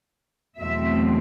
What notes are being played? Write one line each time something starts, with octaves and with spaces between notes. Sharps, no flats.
E2 B2 F#3 A3 C4 E5